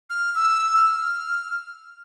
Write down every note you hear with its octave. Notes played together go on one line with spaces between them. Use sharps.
F6
E6
F6